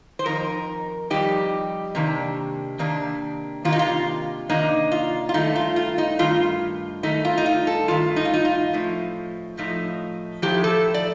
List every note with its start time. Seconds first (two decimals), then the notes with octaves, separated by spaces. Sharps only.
0.19 C5
0.25 F2 D#3 D#4 A#4
1.10 F2 D#3 G3 C4 D#4 G4
1.95 C3 D#3 A#3 D4
2.79 C3 D#3 A#3 D4
3.65 C3 D#3 A#3 D4 F4
3.72 D#4
3.79 F4
4.49 C3 D#3 A#3 D4 D#4
4.92 F4
5.29 F4
5.34 G2 D#3 A3 D#4
5.55 F4
5.76 F4
5.98 D#4
6.19 G2 D#3 A3 F4
7.03 G2 D#3 A3 D#4
7.25 F4
7.37 D#4
7.46 F4
7.67 A4
7.88 G2 D#3 A3 F4
8.16 D#4
8.25 F4
8.34 D#4
8.45 F4
8.73 A2 F3 A3 D#4
9.58 A2 F3 A3 D#4
10.42 A2 F3 A3 D#4 G4
10.64 A4
10.94 D5